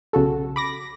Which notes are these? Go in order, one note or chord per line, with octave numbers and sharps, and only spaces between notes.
B1 C#3 F#4 A4
B5 D6 A#6